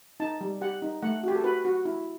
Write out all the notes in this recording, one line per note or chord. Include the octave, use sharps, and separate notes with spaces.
D#4 A5
G3
G4 F#5
D#4
A3 F#5
F#4 G4
A4
F#4 B4
F#4
E4